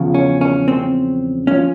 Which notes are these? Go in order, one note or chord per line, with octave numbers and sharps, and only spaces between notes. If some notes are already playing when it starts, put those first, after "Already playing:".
Already playing: E2 C#3 F3
C#4
C#4
C4
F3 C#4